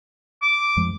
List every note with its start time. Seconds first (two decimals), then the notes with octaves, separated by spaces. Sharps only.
0.42 D6
0.77 F2 F3 G#3